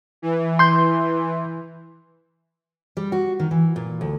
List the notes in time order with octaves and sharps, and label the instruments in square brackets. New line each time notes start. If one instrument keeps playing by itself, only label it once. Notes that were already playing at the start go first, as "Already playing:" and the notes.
[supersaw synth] E3
[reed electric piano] C6 G6
[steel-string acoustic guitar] G3
F#4
D#3
E3
A#2
D2